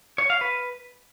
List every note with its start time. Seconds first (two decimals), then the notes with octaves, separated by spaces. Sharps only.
0.18 C#5
0.30 F5
0.41 B4